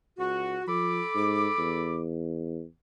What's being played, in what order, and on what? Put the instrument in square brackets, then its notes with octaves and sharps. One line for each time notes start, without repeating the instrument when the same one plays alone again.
[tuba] C#2 [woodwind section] F#4
[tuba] F3 [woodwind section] A4 B5 D6
[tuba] G#2
E2